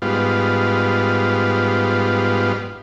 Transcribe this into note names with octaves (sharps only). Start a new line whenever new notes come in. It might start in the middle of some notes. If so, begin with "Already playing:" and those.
G#2 G3 B3 F4